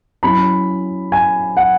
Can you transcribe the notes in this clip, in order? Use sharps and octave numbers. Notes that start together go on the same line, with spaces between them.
F#3 C#4 E4 B5
G#5
F#5